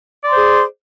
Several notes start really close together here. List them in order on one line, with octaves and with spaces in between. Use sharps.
D5 C6 C5 G#4